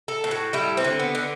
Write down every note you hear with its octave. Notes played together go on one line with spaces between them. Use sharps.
A4
A2
F#4
G3 E4
C4
D3
B3
D3